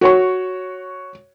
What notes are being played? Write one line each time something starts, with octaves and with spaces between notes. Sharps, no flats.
F#4 C#5 C#6